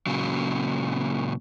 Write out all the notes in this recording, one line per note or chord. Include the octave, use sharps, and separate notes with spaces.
A#2 C#3 F#3